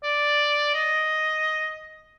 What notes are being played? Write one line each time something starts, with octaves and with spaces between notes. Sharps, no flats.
D5
D#5